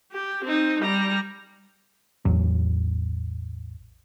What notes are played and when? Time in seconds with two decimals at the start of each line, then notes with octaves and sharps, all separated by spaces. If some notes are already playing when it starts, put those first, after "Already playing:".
0.12 G4
0.44 C4 D#4
0.81 G3 A#5
2.25 A1 E2 F#3